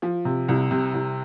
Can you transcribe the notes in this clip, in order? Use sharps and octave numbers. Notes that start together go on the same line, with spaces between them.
F3
C3
C2
C3
C2